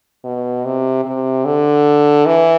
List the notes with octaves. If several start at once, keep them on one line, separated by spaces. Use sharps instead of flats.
B2
C3
C3
D3
E3